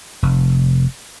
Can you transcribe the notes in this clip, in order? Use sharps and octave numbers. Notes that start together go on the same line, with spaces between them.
F1